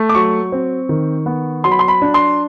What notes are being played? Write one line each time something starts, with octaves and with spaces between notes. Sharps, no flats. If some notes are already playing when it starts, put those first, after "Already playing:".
Already playing: A3
D6
F#3 C#6
C4
D#3
B3
F#3 C6
B5
C6
B5
D4
C6